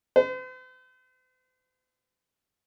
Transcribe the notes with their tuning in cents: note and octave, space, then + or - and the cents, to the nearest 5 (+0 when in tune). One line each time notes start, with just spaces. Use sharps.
C5 -45